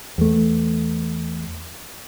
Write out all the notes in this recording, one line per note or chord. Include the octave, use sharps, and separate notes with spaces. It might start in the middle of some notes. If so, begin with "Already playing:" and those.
E2 A3